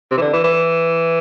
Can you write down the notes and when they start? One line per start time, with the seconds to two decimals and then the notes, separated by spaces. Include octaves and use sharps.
0.11 C3
0.17 E3
0.21 D3
0.33 E3
0.44 E3